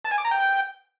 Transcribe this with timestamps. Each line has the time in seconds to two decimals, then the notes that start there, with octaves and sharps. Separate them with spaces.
0.05 A5
0.11 G#5
0.18 D6
0.25 A#5
0.31 G5